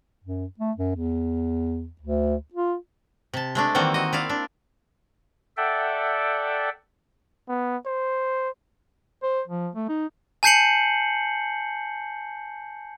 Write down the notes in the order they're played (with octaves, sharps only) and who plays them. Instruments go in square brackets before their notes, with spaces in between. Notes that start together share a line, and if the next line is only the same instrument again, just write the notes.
[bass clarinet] F#2
A3
F#2
E2
D2
F4
[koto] C3 A5
G#3 A3 D4
D#3 E3 G3 A#3 C4 F#4
F#4 D#5
E4 D5 F5
D4
[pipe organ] A4 D5 E5 F#5 G5
[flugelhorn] B3
C5
[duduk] C5
F3
A3
D#4
[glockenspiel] G#5 A5 G6 C7 C#7 F#7